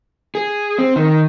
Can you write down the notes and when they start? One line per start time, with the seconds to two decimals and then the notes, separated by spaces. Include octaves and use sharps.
0.35 G#4
0.79 C4
0.96 D#3